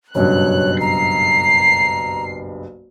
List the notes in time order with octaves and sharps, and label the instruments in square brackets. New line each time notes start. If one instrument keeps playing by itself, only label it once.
[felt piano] F#1 B1 G2 [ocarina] C#5 [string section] F#6
[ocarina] A#5 [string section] C7